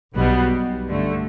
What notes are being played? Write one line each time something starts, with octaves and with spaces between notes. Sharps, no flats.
B1 B2 G3 B3
G2 D3 A3